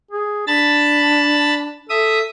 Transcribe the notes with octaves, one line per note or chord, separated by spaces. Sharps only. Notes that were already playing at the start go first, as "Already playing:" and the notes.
G#4
D4 A5 B5 A6
A4 E5 D#6